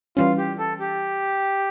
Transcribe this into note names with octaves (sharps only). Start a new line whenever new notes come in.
E3 G3 C#4 F4
G4
A4
G4